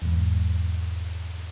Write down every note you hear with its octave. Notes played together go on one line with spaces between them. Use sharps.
E2 G#2